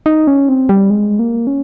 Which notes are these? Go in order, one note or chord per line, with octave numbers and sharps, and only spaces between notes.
D#4
C#4
C4
G3
G#3
A#3
C#4